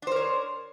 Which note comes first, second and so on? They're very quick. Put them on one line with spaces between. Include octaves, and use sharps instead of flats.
D4 C5 A#4 C#5